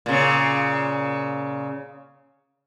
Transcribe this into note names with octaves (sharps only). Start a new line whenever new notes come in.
A#2 C#3